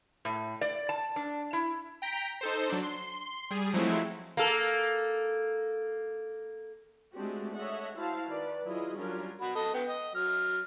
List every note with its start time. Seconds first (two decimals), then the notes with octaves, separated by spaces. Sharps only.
0.25 A2
0.61 D5
0.89 A5
1.16 D4
1.53 E4
2.02 G5 A#5 B6 D7
2.41 D#4 A4 C5
2.69 F#3 D4
2.83 C6
3.51 G3 G#4
3.73 F3 F#3 G#3 A3 C4 E4
4.37 A#3 A4
7.14 G#3 A3 C4 D4 F#4 G4
7.56 A4 C#5 D#5 E5 F#5
7.97 E4 F#4 C5 F5 A5
8.28 D#3 B4 D5
8.64 F#3 E4 F4 G#4 D#5
8.97 F#3 G3 C#4 D4 F4 A#4
9.41 F#4 B5
9.55 A4 D#5
9.74 B3 G5
9.89 D#5
10.15 F#3 F6